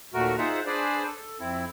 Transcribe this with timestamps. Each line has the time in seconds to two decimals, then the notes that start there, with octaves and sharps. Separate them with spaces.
0.14 D#2 A#2 A3 F#4 A#4
0.38 D#4 F4 G#4 C5 E5 F#5
0.66 D4 G#4 B4 C5 D5
1.06 A4
1.40 F2 C4 E4